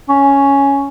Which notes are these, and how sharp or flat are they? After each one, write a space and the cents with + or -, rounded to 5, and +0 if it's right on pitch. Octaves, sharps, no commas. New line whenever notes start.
C#4 +5